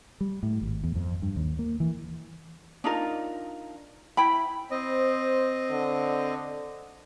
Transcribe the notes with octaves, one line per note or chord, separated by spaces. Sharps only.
G3
A2
G#1
E2
F2
G2
D#2
A#3
E3
D4 D#4 F4 A#4
E4 G5 B5
C4 C5 D#5
D3